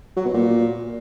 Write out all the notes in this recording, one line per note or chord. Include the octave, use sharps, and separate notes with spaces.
F#3
B2
A#2